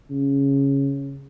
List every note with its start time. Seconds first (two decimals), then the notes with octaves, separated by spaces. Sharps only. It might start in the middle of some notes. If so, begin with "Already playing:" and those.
0.10 C#3